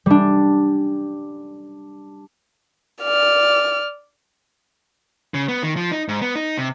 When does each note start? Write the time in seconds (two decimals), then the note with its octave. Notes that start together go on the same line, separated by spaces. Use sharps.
0.06 G3 D4
3.03 D5 F6
5.34 C#3
5.49 B3
5.63 D#3
5.76 F3
5.91 D#4
6.08 G#2
6.22 B3
6.36 D#4
6.58 C3